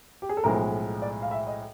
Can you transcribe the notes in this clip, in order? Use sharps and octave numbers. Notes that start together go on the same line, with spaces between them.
G4
G#4
A4
B1 A2 F3 G#3 A#4
D5
F5
E5
D#5